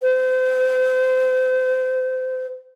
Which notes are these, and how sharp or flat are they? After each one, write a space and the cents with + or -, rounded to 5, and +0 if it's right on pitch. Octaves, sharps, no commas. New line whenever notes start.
C5 -30